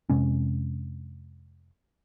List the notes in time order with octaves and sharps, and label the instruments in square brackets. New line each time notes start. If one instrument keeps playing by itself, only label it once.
[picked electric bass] F2 C3 G#3 C#4